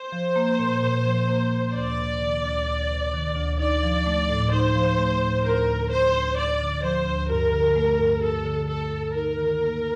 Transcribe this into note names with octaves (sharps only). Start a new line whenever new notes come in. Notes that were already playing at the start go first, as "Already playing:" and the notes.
Already playing: C5
F3
A#3
A#2
A#2
F3
A#3
A#2
D2 D5
C3
D#3
D2
D2
C3
D#3
D2
D#4 D5
F3
A3
A2
D#4 C5
F3
A3
A2
D2 A#4
D3
F3 C5
D2
D2 D5
D3
F3 C5
D2
G2 A#4
D3
A3
G2
G2 A4
D3
A3 A4
G2
D#4 A#4
D#3
A#3